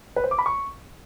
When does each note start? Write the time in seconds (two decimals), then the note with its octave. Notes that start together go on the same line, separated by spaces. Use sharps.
0.16 B4
0.24 C5
0.31 D6
0.39 B5
0.46 C#6